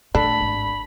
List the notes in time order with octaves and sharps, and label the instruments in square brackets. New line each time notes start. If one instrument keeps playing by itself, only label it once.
[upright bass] A2 D3 [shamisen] D4 A4 [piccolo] B5
[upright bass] G#1